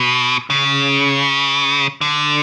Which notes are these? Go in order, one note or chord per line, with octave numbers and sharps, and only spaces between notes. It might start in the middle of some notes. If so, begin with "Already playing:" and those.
Already playing: B2
C#3
D3